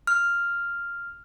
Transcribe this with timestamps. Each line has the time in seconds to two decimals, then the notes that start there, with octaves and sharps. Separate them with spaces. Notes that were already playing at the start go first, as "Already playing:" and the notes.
0.07 F6